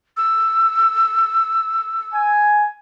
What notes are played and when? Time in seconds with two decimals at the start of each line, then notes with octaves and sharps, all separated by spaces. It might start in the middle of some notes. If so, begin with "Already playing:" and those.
0.17 E6
2.14 G#5